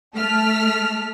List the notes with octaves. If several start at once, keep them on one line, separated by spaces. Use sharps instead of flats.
A3 A5 F6 B6